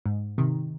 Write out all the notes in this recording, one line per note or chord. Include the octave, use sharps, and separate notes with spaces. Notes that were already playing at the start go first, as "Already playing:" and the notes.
G#2
C3 D#3